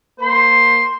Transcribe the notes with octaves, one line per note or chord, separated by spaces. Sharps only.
A#3 C5 C6